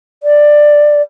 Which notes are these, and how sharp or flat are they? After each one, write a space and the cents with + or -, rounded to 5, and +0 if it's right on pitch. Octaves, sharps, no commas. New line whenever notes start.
D5 +10